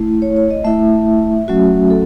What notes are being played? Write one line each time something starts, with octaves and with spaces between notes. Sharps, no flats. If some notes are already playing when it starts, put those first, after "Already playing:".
Already playing: A3 E4
C#5
C#5
D#5
A3 E4 E5
F#3 A3 C#4 F#4
A4